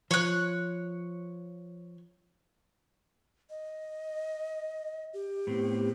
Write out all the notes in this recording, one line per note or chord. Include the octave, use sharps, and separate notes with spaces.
F3 C#5 F#6
D#5
G4
A2 B3 C4